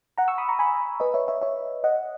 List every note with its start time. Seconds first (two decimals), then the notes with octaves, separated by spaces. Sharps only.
0.18 F#5 A#5
0.28 C#6 E6
0.38 B5 D#6
0.49 A#5 C#6
0.59 G#5 B5
1.00 B4 D#5
1.14 C#5 E5
1.28 C#5 E5
1.42 C#5 E5
1.84 D#5 F#5